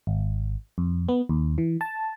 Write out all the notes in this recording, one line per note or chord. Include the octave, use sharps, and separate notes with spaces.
G#1
F2
B3
D#2
E3
A5